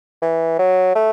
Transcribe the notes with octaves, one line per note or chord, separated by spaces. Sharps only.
E3
F#3
A3